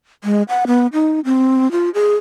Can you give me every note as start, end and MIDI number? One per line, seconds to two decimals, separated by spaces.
0.24 0.43 56
0.49 0.65 78
0.67 0.87 59
0.93 1.20 63
1.25 1.71 60
1.71 1.90 65
1.94 2.16 68